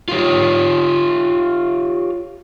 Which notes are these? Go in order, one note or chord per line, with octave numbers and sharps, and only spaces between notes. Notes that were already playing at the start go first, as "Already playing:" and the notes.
F4 G4 C#5